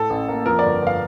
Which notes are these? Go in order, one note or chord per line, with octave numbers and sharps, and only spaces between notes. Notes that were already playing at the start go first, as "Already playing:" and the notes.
Already playing: A2 A4
A1
A#3
F2 A#4
G1 D5
G1 F5